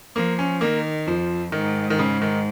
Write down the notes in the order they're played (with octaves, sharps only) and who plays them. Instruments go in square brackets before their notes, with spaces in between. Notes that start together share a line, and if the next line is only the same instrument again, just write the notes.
[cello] F3 [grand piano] A#3
[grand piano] C#4
[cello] D#3 [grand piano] A#3
[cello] F2 [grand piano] F3
[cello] G#2 [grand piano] D#3
[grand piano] D#3
C#3
D#3